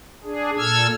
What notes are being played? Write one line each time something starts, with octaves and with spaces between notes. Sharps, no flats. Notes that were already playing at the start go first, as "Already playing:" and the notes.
D4 G#4
A#2 A4 E6 F6 G#6